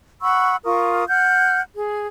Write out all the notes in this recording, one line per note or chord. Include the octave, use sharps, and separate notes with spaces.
F#5 B5 C#6 E6
F4 A#4 C#6 D#6
F#5 F6 G6
G#4